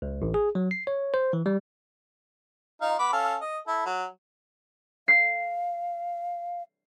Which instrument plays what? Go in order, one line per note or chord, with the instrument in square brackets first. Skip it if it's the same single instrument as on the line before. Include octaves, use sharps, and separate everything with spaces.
[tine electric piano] C#2
A1
G#4
F#3
C7
C#5
C5
E3
G3
[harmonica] D#4 F4 F5
B3 B5 D6
C#4 A4 F5
D#5
E4 A4
F#3
[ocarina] F5 [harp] C7